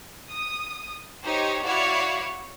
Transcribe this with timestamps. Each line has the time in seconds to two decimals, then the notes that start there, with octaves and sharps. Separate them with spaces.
0.29 D#6
1.24 D#4 G4 C5 C#5
1.64 E4 F#4 C#5 D5 F5